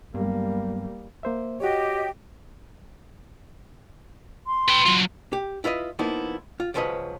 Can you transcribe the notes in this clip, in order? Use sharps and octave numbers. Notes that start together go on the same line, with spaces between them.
G2 F#3 G3 A#3 B3
A#3 C5 E5
F#4 G4 C#5 D#5
C6
B4 G5
F#3 F4
G4
E4 F4 B4 D#5
F3 A#3 B3 D#4 E4
F4
C#2 G#2 F3 F#3 B4 D#5